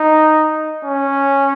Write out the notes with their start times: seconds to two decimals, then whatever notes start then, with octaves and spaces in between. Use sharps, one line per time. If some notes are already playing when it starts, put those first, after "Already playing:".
Already playing: D#4
0.85 C#4